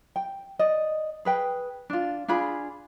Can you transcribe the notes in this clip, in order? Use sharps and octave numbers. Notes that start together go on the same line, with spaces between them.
G5
D5 D#5
G#4 B4 G5
D4 F4
D4 F4 G#4 B5